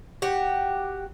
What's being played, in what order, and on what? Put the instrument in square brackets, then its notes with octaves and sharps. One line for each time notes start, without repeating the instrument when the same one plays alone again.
[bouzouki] F#4 G4